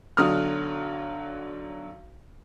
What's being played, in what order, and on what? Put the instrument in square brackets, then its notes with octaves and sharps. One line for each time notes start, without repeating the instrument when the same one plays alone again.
[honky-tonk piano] B1 D3 F#3 D#6 F6